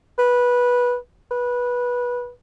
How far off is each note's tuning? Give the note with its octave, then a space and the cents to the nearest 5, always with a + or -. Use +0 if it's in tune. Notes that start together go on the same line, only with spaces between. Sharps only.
B4 -15
B4 -15